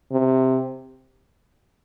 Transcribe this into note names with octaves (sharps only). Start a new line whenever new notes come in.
C3